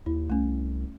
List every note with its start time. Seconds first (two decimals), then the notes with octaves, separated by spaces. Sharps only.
0.06 D#2 E4
0.30 C2 A3 C#4